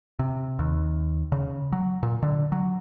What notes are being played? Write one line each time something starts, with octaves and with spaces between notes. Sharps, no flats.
C3
D#2
C#3
F#3
A#2
D3
F#3